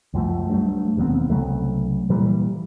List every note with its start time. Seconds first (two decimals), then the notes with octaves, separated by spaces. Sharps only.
0.14 C#2 F#2 F3 A3
0.50 G2 F#3 A3
0.97 E1 D#2 B3 C4
1.30 C2 C#3 F#3 A3
2.10 A#2 E3 G3